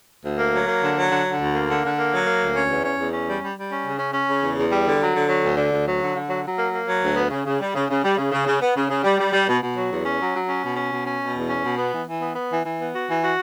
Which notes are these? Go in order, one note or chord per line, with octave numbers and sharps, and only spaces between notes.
D2
A#3
F#3
A#3
D3
F#3
D3
D3
D2
A#3
D3
D3
A#3
F#3
A#3
D2
C#4
E2
C#4
E2
C#4
G3
G3
G3
C#4
C#3
C#4
C#4
C#3
E2
E2
G3
D3
F#3
D3
F#3
D2
D3
D2
F#3
D3
D3
F#3
F#3
A#3
A#3
F#3
D2
B3
C#3
C#3
G3
C#3
C#3
G3
C#3
C#3
C#3
B3
C#3
C#3
G3
G3
G3
B2
B2
F#3
E2
C#4
F#3
F#3
C#4
B2
C#4
B2
C#4
B2
E2
C#4
B2
B3
E3
E3
B3
B3
E3
E3
B3
F#4
E3
F#4